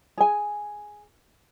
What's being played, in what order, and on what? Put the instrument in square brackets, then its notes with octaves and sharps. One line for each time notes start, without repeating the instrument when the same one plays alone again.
[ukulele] G#4 G#5